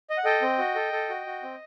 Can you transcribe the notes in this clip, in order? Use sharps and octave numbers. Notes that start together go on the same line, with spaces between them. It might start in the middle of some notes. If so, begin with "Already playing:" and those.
D#5
F#5
A4 D#5 G5
C4
F#4
A4
A4
F#4
F#4
C4